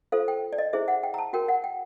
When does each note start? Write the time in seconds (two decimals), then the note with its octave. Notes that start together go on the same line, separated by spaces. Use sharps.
0.12 F4 A4 C5 F5
0.28 G5
0.53 D5
0.58 D#5
0.73 E4 G#4 C5 E5
0.88 F#5
1.03 G5
1.14 A#5
1.18 A5
1.33 F#4 A#4 C#5 G5
1.48 F#5
1.64 G5